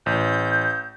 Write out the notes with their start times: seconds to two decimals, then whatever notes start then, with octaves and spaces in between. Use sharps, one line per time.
0.06 A1 G6